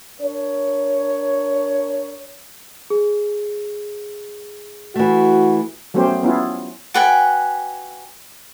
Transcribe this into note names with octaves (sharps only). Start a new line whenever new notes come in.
D4 A#4 C#5
G#4
E3 A3 F#4
F#3 A3 B3 C#4 G4 C5
B3 C#4 E4 F4
F#4 B4 G5 G#5